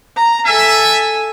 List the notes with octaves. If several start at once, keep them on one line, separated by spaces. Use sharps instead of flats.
A#5
A4 E5 G#5